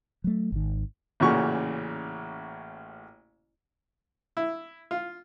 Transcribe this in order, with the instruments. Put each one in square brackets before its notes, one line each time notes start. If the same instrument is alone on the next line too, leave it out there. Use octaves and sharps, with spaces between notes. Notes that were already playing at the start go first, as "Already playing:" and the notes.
[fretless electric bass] F#3 A3
G#1 D#3
[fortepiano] A1 A#2 C#3 F#4 C#6
E4
F4